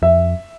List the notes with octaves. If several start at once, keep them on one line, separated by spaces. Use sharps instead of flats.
F2 E5